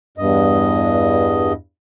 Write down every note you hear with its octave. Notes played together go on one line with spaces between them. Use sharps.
E2 G2 D#5